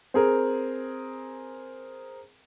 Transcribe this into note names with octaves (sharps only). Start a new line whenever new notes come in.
C4 G#4 A#4